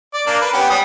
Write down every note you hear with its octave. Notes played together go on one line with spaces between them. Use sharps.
D5
A#3 D4
B4
B3 C#4 G4
G3 D#6